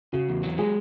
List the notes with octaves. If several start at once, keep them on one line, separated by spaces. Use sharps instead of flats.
C#3 F#4
E2
F#3
G#3 G#4